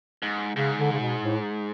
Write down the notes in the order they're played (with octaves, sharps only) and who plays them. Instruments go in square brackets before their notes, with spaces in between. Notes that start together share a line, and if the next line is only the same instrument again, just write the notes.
[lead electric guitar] G#2
[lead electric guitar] G#2 [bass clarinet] C#3
[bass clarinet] D3
C#3
B2
A2